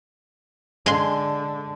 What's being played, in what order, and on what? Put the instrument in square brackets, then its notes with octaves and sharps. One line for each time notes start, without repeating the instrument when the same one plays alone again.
[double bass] D3 [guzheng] G#3 C6